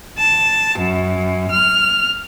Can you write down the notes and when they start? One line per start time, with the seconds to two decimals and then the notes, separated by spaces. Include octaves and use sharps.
0.19 A5
0.78 F#2
1.51 F6